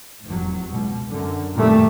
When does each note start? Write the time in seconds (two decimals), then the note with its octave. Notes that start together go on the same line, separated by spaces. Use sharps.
0.25 F1 E2 F#3
0.71 C#2 B2
1.06 F#2 D3
1.56 F2 A#2 D#3 G3 A3